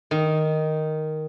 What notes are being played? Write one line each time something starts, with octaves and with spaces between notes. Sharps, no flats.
D#3